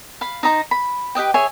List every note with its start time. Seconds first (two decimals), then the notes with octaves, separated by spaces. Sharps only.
0.21 F5 B5
0.43 D#4 C5 D#5 A#5
0.71 B5
1.15 G4 B4 D#5 G5
1.34 G#4 C#5 E5 G#5